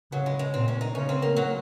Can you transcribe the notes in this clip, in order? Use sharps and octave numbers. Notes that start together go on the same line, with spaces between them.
C#3 F#3
G#3
G#3
A#2 C4
C#4
D#4
C#3 C#4
C4
A#3
F#3